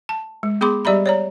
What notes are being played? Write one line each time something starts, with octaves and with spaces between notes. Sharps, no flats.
A5
G#3
B3 G#4 B5 C6 D6
G3 G4 D5 E5 A#5 B5
C#5 D5 A#5